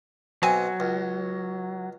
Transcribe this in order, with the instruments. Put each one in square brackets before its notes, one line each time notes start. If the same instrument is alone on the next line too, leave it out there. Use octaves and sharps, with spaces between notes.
[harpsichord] B1 C4 [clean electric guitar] F#3 [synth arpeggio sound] G#5
[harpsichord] C#2